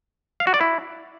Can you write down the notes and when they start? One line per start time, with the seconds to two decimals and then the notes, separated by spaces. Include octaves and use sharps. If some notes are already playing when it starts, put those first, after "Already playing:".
0.40 F5
0.47 F#4
0.54 D5
0.61 E4